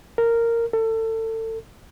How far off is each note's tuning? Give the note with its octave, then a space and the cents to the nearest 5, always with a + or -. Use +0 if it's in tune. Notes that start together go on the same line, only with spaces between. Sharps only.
A#4 -10
A4 +30